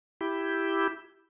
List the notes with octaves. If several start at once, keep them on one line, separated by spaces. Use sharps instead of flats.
E4 G4